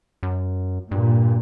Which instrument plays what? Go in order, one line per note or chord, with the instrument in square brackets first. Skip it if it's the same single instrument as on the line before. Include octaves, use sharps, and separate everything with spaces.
[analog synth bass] F#2
[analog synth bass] G2 [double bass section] A#2